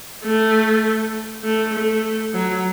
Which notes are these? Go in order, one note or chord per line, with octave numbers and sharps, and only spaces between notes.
A3
A3
A3
F#3